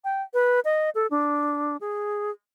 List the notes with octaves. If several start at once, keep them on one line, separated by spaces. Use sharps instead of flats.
G5
B4
D#5
A4
D4
G#4